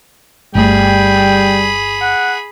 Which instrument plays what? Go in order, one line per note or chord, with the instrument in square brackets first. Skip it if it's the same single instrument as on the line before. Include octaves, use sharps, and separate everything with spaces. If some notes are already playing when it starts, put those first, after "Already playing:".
[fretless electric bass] G1 A3 [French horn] G3 [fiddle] G#4 B5 [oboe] G5
[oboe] F#5